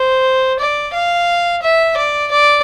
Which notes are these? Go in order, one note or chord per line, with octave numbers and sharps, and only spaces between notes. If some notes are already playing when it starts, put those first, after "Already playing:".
Already playing: C5
D5
F5
E5
D5
D5